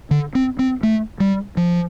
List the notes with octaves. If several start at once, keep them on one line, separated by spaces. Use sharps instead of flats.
D3
C4
C4
A3
G3
F3